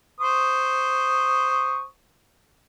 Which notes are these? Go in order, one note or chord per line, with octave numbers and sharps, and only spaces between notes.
C5 C#6 D#6